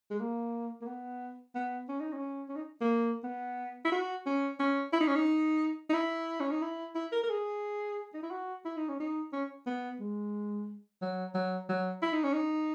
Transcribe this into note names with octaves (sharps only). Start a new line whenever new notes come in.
G#3
A#3
A#3
B3
B3
C#4
D#4
C#4
C#4
D#4
A#3
B3
E4
F#4
C#4
C#4
E4
D#4
C#4
D#4
D#4
E4
C#4
D#4
E4
E4
A#4
A#4
G#4
D#4
E4
F#4
E4
D#4
C#4
D#4
C#4
B3
G#3
F#3
F#3
F#3
E4
D#4
C#4
D#4